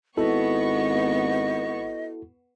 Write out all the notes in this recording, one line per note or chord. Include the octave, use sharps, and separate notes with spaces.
G#1 B3 E4 F#4 A4 D#5 C#6